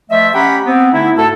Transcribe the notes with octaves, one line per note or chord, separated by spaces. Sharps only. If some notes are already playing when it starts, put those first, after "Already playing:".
F3 A3 D#5 E5
C#4 G4 F#5 G5 A#5 B5
B3 C4
D3 A3 D#4 E4
G#2 A3 F#4 A4